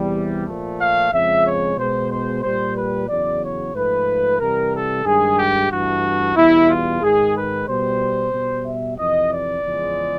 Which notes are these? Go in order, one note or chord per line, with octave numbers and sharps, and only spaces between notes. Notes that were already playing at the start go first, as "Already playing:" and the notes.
Already playing: E2 C3 E3 G3
A#2 F3 A3
F5
F2 C#3 F3 G#3 E5
C#5
B2 G#3 C5
C5
A#2 G3 C5
B4
E2 C#3 F#3 D5
C#5
G#2 F3 A3 B4
C3 E3 G3 A#4
A4
G2 D#3 G#3 G#4
G4
G2 E3 A3 F#4
E2 B2 G3 E4
F4
G#2 D#3 G#3 G#4
B4
B2 G3 C5
B2 G3
E5
F2 C3 E3 D#5
D5
E2 C#3 F3 G#3